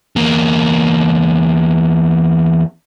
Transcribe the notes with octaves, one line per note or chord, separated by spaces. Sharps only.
E2 A#3